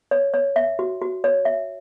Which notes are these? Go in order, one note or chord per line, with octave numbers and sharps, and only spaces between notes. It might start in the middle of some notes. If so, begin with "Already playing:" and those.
C#5
C#5
E5
F#4
F#4
C#5
E5